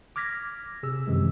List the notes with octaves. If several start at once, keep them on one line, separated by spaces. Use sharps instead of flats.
D6 F6 G#6 A#6 B6
C3 G#4 E6
F#2 C3 D#3 E3 G#3